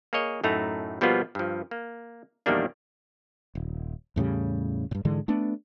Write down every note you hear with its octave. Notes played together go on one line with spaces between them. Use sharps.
A#3 G#4 C#5 D#5
F#2 A2 A3 D#4 A#5
B2 F3 G3 A#3 B3 F4
G2 F3
A#3
A#1 E2 D#3 G3 A#3 D4
D#1
E2 A2 C#3 G3
G2 A#2
G#2 D3 E3 G#3
A3 B3 D4